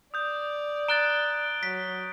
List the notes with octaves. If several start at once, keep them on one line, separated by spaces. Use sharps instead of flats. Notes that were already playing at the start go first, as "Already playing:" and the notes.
D5 D#6 G6
A#5 F#6 A6 D7 G7
F#3 B6